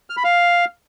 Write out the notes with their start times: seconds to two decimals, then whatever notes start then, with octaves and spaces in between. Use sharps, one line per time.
0.10 F6
0.17 B5
0.24 F5